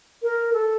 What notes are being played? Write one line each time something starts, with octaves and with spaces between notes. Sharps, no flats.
A#4
A4